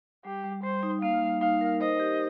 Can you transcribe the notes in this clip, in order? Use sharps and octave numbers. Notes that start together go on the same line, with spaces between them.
G3 G4
G3
G3 C5
D#4
A#3 F5
G3
D#4 F5
A#4
C5 D#5
G4